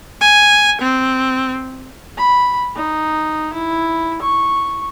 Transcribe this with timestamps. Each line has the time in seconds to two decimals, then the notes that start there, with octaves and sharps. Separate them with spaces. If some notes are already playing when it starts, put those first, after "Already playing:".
0.21 G#5
0.82 C4
2.18 B5
2.76 D#4
3.54 E4
4.22 C#6